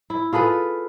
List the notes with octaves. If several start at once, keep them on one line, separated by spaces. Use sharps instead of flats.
E4
F4 G#4 A4 B4